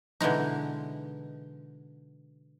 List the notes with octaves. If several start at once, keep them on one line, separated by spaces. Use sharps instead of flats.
B2 D3 E3 G#3 D#4